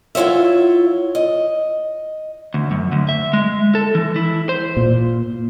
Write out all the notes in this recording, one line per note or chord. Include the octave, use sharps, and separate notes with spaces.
F#3 E4 F4 C#5 E5
D#5
D2
F#2
D2
E5
G#3
A4
E3
E4
C5
A#2